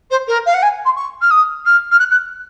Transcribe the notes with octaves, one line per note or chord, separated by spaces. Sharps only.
C5
A#4
F5
F#5
G#5
C6
C#6
F6
D#6
F6
F6
F#6
F#6